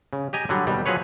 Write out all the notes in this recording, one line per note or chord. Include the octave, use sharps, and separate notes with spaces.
C#3
G4 D#5 G#5 A#5
D3 F#3 G3
D#2 B2 G3
F3 F#3 G#4 B4 C#5